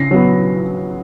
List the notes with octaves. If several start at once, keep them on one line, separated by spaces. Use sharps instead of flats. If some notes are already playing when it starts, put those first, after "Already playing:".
Already playing: C#3 A#6 C7
F#3 B3